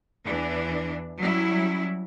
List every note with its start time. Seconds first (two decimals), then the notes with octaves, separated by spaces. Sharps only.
0.24 E2 E3 D4
1.18 F#3 G3 C#4 E4